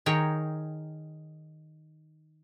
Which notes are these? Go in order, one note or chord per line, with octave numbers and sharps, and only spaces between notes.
D#3 G#4 A#4 C#5 G5